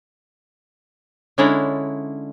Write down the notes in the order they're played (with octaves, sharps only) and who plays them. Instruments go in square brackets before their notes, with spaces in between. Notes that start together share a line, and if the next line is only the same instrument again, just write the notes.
[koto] D3 G#3 C#4 D4 E4 A#5